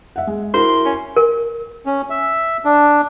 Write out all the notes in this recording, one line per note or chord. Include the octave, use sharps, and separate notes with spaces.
E5 F#5
G#3
E4 F#4 A#4 C6
C#4
A#4
C#4
E5
D4